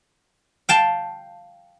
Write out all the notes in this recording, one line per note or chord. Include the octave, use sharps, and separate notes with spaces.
F5 G5 A5